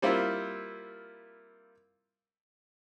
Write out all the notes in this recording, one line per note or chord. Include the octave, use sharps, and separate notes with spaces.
G3 A#3 C4 E4 F4